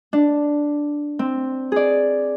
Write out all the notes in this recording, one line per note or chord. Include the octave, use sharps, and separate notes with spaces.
D4
C4
G#4 D5